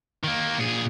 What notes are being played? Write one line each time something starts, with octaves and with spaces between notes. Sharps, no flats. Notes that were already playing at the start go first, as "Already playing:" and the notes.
D#3 A#3
A#2 G#4